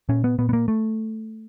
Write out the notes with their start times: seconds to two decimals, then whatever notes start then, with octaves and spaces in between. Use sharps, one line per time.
0.09 A#2 C#4
0.24 B3
0.38 A#2 B3
0.49 B3
0.53 A#3
0.68 A3